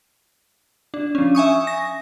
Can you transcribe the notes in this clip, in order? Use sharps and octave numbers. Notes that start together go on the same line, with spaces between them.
D4
F3 C#4
E5 G#5 C#6 D#6
A#6